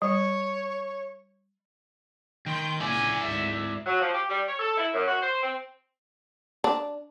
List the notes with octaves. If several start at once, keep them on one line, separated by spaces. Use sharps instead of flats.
G3 C#5
D#3 G5 C6 G6
A#1 C#3 E4 D5 G#5
G#1 D2 G#2 E5
F#3
F3
G4
G3
C#5
A4
E4
F#2
F#4
C5
C4
D4